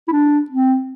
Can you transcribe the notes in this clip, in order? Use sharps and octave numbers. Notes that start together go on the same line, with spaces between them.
E4
D4
C4